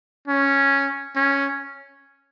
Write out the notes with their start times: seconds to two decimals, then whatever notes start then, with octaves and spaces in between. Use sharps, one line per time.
0.28 C#4
1.16 C#4